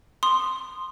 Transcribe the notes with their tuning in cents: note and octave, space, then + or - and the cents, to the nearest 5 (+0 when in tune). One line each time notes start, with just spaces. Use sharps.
C6 +0 D#6 -15